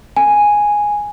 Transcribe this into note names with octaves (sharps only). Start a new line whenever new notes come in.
G#5